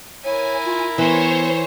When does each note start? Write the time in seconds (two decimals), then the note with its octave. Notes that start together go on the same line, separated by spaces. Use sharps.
0.25 E4 A#4 C#5 G#5
0.65 F4
0.98 E3 B3 C5 C#5